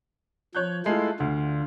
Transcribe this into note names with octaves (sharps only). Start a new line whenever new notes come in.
F3 C#5 F#6 G6
G#3 A3 E4 F4 A4 C7
D2 D3